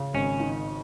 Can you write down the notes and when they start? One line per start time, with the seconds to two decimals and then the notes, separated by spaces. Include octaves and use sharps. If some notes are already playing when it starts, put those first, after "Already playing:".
Already playing: C#3
0.14 G#1 C#4
0.40 D#3